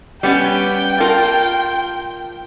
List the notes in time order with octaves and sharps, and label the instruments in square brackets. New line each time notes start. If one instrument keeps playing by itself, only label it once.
[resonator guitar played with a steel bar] G3 B3 C#4 [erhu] G5
[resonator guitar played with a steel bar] F4 A#4 A5